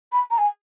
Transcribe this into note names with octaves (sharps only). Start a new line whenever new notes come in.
B5
A#5
G#5